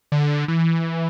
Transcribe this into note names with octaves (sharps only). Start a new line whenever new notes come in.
D3
E3